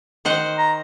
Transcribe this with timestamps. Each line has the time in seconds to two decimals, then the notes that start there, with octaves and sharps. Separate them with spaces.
0.25 D#3 C5 F#5
0.58 A#5